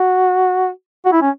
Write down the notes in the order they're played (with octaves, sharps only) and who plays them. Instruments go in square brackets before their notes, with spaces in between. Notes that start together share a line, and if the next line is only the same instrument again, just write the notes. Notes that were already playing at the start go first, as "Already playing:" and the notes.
Already playing: [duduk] F#4
F#4
E4
C#4